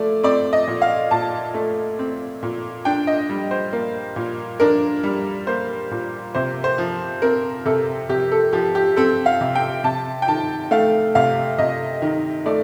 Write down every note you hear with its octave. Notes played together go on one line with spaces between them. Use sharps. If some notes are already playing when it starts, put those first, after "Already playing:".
Already playing: A#2 A3 D5
C4 D5
D#5
A#2
F5
A#2 A5
A3
C4
A#2
D4 G5
D#5
G3
C5
A#3
A#2
D4 A#4
G3
A#3 C5
A#2
C3 C5
C5
F3
C4 A#4
C3 A4
C3 G4
A4
F3 G4
G4
C4 A4
F5
C3
G5
C3 A5
G5
D#3 A5
A3 F5
C3 F5
C3 D#5
D#3
A3 D5